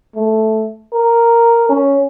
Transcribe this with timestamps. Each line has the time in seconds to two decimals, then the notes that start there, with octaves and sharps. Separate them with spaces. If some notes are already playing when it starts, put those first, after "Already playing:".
0.15 A3
0.93 A#4
1.69 C#4